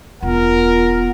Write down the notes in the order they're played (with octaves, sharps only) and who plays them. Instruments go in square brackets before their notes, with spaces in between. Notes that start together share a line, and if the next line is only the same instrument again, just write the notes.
[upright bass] E1 [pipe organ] B3 [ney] F4 [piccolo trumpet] A#4